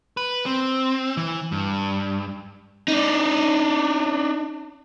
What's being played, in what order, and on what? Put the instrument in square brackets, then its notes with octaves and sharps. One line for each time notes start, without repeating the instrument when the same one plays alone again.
[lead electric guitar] B4
C4
E3
G2
[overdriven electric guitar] D4 D#4